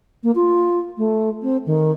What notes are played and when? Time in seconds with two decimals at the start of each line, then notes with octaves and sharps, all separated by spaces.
0.23 A#3
0.35 F4
0.98 A3
1.42 C4
1.66 D#3